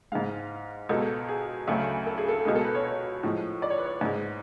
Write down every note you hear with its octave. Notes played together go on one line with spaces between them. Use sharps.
G#2 G#3 F5
C#2 B2 G#3 A4
G#4
D2 C#3 F#3 A3
A4
G#4
A4
C#2 B2 G#3 G#4
A4
B4
C#5
C#5
A2 F3 G#3
D5
C#5
B4
C#5
G#2 G#3